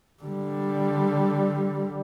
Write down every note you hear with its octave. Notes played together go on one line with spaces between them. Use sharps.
D3 G3